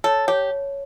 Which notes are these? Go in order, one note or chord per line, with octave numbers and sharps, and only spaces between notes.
A4 C#5
G4 C#5